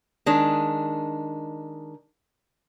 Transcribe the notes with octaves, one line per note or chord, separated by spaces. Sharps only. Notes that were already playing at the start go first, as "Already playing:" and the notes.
D#3 G#3 D4